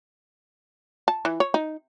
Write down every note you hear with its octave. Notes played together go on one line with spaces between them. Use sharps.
A5
E3
C#5
D#4